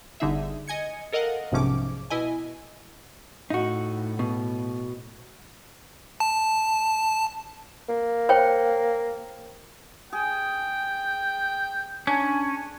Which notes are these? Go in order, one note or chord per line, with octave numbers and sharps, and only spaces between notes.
G1 D3 D#4 G#4 E5
D#5 G#5 G#6 C#7
A4 A#4 D#5 F5 F#5
B1 G#2 C3 F3 C#4 D6
B2 E4 D#5 G#5
A2 D#4 F#4
B2
A5
A#3
C5 C#5 G5
G#4 G5
C#4 D4 G#5